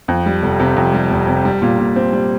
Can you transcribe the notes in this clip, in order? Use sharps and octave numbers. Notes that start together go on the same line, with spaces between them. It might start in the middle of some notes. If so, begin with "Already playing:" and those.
F2
G3
F1
C3
F2
G3
F1
C3
G3
A#2
A#2
C4
G3